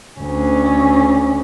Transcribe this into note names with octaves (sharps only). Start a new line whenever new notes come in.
D2 C#4